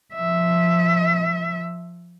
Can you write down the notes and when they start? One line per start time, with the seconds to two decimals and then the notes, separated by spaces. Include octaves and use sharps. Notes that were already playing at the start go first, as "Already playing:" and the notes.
0.15 F3 E5